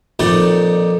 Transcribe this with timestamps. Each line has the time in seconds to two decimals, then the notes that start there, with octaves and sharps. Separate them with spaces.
0.20 F2 A#2 D#4 D5 G5